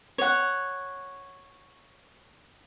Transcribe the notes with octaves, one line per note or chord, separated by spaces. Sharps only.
C#5 F#5